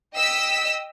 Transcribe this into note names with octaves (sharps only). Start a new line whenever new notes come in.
D#5 G5 E6 B6